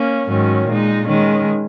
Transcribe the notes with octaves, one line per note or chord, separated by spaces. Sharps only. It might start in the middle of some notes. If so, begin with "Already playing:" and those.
Already playing: A#3 C#4
G#2 D#3 F#3 C#4
A#2 G#3 D#4
D#3 G#3 C#4